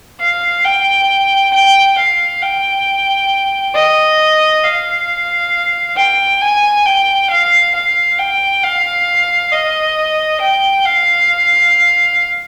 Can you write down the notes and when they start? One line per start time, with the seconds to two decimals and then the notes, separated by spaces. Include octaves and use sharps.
0.20 F5
0.64 G5
1.53 G5
1.98 F5
2.42 G5
3.75 D#5
4.64 F5
5.97 G5
6.41 G#5
6.85 G5
7.30 F5
7.75 F5
8.18 G5
8.63 F5
9.52 D#5
10.40 G5
10.85 F5